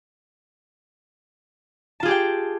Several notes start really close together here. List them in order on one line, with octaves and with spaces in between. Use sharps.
A5 F4 G#4 G4 G5